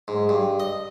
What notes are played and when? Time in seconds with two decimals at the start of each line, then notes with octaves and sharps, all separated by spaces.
0.08 G#2
0.29 G2
0.60 D#5